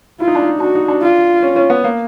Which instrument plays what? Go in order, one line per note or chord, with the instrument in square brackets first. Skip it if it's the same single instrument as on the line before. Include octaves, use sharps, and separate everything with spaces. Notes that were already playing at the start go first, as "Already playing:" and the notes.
[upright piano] E4 [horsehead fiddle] F4
[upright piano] D#4
D4
D#4
[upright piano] D4 [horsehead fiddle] F#4
[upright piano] D#4
D4
[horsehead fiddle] F4
[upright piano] C#4
C#4
B3
A#3